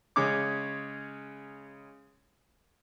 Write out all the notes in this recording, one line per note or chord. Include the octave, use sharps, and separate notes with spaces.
C#3 G#3 C#4 D6